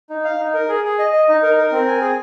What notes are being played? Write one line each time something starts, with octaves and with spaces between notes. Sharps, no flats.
D#4
F5
D#4
A#4
G#4
G#4
D#5
D#5
D#4
A#4
A#4
C4
G#5
G#4